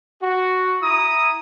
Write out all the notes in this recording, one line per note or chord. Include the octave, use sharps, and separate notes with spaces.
F#4
E4 A#5 D#6